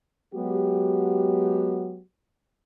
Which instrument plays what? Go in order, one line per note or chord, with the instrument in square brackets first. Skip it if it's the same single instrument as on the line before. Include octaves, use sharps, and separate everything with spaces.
[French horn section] F#3 G#3 B3 F#4 G4